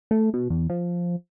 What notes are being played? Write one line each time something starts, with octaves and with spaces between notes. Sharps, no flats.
A3
B2
E2
F3